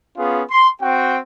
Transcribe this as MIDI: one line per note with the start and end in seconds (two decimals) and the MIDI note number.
0.17 0.42 59
0.17 0.42 61
0.17 0.42 65
0.17 0.42 68
0.50 0.69 84
0.81 1.18 60
0.81 1.18 66
0.81 1.18 79